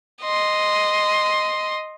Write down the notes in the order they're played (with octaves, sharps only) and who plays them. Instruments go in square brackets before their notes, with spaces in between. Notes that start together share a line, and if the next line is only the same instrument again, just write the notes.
[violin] D#5 C6